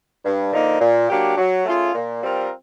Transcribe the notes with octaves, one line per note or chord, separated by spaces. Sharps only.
G2
D3 F3 A#3 D#4
A#2
F#3 A#3 D4 G4
F#3
A3 C#4 F4 G#4
A#2
G3 C4 F4 A#4